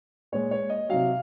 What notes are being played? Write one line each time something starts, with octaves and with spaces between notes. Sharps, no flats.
A#2 G#3 C#5
C#5
D#5
C3 F#3 F5